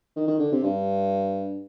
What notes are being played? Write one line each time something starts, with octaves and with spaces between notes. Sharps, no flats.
D#3
D#3
D3
C3
G2